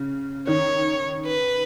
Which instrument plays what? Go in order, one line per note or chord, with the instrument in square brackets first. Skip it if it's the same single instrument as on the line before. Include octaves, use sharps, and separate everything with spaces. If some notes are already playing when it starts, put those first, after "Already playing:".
Already playing: [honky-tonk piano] C#3
[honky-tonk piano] D#3 [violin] C#5
[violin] B4